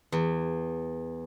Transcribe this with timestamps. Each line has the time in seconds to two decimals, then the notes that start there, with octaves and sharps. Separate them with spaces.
0.12 E2